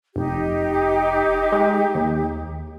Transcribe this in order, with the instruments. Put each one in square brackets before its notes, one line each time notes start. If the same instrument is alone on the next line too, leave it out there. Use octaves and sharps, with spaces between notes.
[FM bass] F1 [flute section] D#4 G4
[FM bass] G#3
D#2